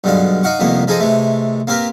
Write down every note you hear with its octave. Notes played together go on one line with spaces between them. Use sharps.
B1 G2 D3 G#3 F5
D#4 D#5 F5 F#5 C#6
C2 F2 D#3 A#3 B3
F3 D#4 G#4 A4 C5 D#5
C3 E3 G#3 A3
A#3 C4 G4 A#4 B4